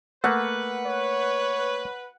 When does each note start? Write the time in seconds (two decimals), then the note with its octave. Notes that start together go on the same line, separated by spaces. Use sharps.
0.24 A3 A#3 B4 F#5
0.86 C#5